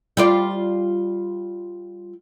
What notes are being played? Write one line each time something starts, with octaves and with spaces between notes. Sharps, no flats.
G3 F4 D5